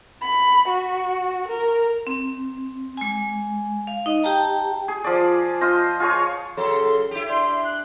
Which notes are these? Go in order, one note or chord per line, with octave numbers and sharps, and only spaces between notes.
B5
F#4
A#4
C4
G#3 G#5
F5
D#4 D#5
G4 G5 A5 A#5
G#4
F3 D5
F4 C5 D#5
F4 G#4 C#5
C#3 F#3 A4 C6
E4 G4
D4 C6
F#6